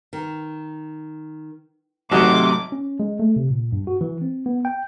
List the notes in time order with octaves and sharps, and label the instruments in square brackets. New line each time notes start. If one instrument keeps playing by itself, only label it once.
[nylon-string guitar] D#3
[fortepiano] G#1 F#4 D#5 [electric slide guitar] C3 [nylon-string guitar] F#3 A3 [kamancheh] D6
[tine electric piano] C#4
G#3
A3
C3
A#2
G2
F#4
E3
C4
B3
G5